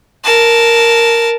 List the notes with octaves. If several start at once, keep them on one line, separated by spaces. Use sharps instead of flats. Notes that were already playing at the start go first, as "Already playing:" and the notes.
A#4 A5